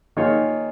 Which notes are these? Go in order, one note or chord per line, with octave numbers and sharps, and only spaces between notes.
D#3 A#3 D#4 F4 G#4 C#5